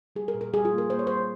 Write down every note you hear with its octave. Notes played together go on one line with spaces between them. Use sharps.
G3 G#4
A#4
A#2
A#4
G3 G#4
F4
A#3
A#4
A#3 C5
C#5
G3 C5